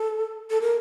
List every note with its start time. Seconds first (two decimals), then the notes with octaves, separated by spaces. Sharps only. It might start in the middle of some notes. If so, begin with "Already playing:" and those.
Already playing: A4
0.51 A4
0.62 A#4